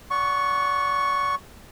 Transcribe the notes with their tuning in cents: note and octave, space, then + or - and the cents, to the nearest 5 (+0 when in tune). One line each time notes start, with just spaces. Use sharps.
D5 -35 F#5 +0 C#6 +0